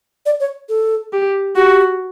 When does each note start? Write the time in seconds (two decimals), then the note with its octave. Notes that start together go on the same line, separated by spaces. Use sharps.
0.26 D5
0.40 C#5
0.69 A4
1.13 G4
1.56 F#4 G4